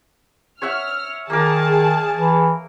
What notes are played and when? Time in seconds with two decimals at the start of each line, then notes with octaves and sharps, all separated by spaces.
0.62 C#5 E5 F#5 F6
1.30 D#3 A#3 G#4 A#4 A5
2.15 E3